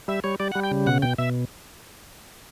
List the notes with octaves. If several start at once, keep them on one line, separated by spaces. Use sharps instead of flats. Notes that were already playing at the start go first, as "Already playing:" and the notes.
G3 E5
G3 C#5
G3 D5
F#5
G3
G5
C#3
B2 F#5
B2 G5
B2 E5